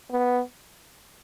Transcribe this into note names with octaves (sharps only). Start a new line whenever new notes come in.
B3